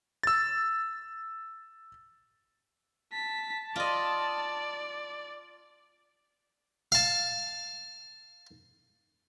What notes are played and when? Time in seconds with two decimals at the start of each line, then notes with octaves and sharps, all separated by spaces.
0.23 E6 A6
3.13 A5 B6
3.76 F4 D5 D#5
6.92 F5 A5